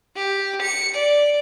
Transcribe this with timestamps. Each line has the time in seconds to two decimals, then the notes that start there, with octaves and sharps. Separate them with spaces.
0.16 G4
0.62 C#7
0.95 D5